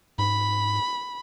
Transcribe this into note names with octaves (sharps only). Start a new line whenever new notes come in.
G#2 B5